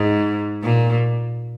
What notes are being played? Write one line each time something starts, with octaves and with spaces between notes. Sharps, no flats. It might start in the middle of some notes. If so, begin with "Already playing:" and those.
Already playing: G#2
A#2